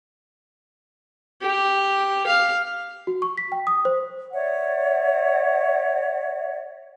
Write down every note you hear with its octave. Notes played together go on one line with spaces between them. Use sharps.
G4
F5
F#4
C#6
B6
G5
D#6
C5
C#5 D5 E5 F#5